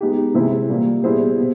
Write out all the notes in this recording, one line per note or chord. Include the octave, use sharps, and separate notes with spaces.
G#3 B3 D#4 G4
C3 E3 G#3 C4 E4
A#2 G3 A#3
G3 B3 E4 G#4 C5
B2